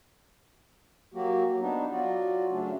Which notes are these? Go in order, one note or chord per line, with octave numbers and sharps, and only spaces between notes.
F#3 A#3 F#4 G4
B3 D4 D#4
F#3 F4 F#4 D5
C#3 F#3 A3 C#4 D4